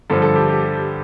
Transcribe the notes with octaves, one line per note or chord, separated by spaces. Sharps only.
G2 D3 F3 A4
A4
G4
G4